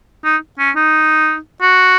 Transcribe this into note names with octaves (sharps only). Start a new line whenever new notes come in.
D#4
C#4
D#4
F#4